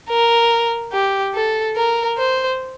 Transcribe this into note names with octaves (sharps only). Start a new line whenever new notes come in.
A#4
G4
A4
A#4
C5